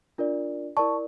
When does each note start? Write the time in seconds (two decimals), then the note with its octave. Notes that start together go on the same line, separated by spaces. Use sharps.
0.18 D4 F4 A#4 D5
0.77 E4 A#4 D5 A5 C#6